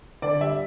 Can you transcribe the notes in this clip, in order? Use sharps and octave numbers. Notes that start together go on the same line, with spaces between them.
D3 D5
G3 E5